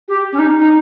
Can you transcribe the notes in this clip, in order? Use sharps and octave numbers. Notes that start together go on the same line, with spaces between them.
G4
C#4
D#4
D#4